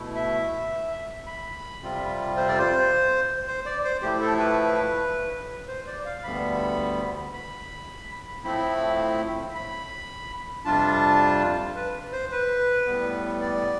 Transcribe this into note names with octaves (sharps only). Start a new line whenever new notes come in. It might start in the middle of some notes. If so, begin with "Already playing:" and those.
Already playing: B2 A3 E4
E5
B5
F2 C3 G3 C4 F4
C5
D5
C5
C5
D5
C5
A2 F3 A3 E4 G4
A4
B4
C5
D5
F5
D2 D3 G3 B3 B5
B5
A2 F3 A3 C4 E4 B5
B5
F2 C3 G3 D4 F4 A5
B4
C5
B4
A2 G3 B3
D5